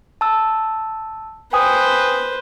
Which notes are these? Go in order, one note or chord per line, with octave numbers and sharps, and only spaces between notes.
A5 E6
B4 C5 G5 G#5 D#6